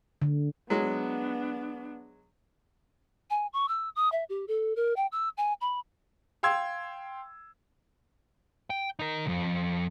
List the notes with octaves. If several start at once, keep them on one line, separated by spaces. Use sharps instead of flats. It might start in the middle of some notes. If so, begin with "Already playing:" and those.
D3
F#3 G#3 B3 D4
G#5
C#6
E6
D#6
E5
G4
A4
A#4
G5
E6
G#5
B5
F5 G5 C6 E6 G#6
G5
D#4 A#4
C2 F2